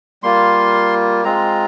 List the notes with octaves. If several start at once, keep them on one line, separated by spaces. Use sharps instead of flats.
G3 A#3 F4 C6
G#3 C4 F4 A#5